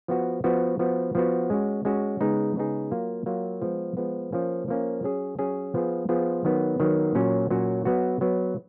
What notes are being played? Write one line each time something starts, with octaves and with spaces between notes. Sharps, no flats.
F3 B3 F#4
F3 B3 F#4
F3 B3 F#4
F3 B3 F#4
G#3 C#4 F#4
G#3 C#4 F#4
C#3 G#3 B3 D#4 G#4
C#3 G#3 B3 D#4 G#4
F#3 A#3 F4
F#3 A#3 F4
F3 G#3 B3
F3 G#3 B3
F3 A#3 C#4
F3 A#3 C#4
F#3 C#4 G#4
F#3 C#4 G#4
F3 B3 F4 G#4
F3 B3 F4 G#4
D#3 F#3 B3
D#3 F#3 B3
A#2 F#3 C#4 F#4
A#2 F#3 C#4 F#4
F#3 B3 F#4
F#3 B3 F#4